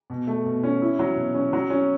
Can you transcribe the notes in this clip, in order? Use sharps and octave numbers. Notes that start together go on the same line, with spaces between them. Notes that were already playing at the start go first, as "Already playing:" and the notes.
B2
A3
B2
C#4
E4
F#3
B2
C#4
F#3
C#4